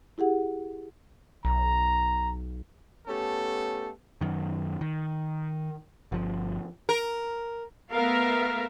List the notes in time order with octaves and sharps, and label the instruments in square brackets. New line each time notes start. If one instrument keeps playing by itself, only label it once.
[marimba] E4 G4 G#4 F#5
[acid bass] B1 [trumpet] A#5
[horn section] A3 B3 C#4 G4 A4
[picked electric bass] F#2 D#3
D#3
G1 F3
[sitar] A#4
[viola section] A3 B3 A#4 E5 F5